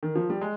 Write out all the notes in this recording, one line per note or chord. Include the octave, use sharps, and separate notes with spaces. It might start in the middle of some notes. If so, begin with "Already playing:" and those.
D#3
F3
G3
G#3